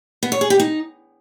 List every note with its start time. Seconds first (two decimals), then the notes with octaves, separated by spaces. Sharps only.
0.23 B3
0.32 C#5
0.41 G#4
0.50 G4
0.60 D#4